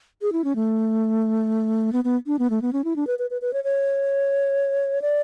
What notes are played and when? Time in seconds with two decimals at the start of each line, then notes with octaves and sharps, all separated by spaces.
0.22 G#4
0.32 E4
0.44 C#4
0.55 A3
1.93 B3
2.04 B3
2.27 D4
2.39 B3
2.50 A3
2.62 B3
2.73 C#4
2.84 E4
2.96 D4
3.07 B4
3.19 B4
3.30 B4
3.42 B4
3.53 C#5
3.64 C#5
5.02 D5